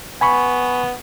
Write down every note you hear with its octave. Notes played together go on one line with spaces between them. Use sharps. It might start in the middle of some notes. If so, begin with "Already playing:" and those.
B3 G#5 B5 C#6